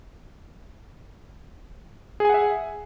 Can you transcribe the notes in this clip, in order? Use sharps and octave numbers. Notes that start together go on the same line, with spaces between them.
G#4 E5 F#5 G#5